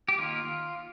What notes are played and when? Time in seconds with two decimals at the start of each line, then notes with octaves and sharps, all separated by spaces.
0.08 G4
0.18 D#3 A#3 F4